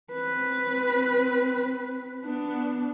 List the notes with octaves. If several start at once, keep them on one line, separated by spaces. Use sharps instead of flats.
C4 B4
B3 D4